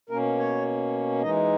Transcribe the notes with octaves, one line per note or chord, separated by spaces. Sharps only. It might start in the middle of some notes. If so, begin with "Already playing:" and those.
B2 A#3 C#4 A#4
C#5
E3 G#3 D#4 D#5